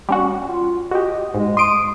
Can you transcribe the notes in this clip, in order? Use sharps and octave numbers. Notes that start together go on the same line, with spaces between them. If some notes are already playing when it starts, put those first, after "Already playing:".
G3 C#4 F#4
F4
F#4 G4 D#5
G#2 G#3
C6 D#6 D7